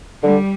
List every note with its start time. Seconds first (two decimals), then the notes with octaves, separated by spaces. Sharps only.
0.23 D3 G3